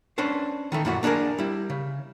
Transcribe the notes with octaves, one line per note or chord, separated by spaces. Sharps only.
C#4 D4 B4 C5
D#3 E3 A3
F#2 A#2 E4 F#4
A#3 D4 D#4 G#4 A#4
G3 E4
C#3